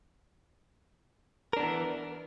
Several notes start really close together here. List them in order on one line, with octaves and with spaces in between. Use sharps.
A#4 D4 B3 E3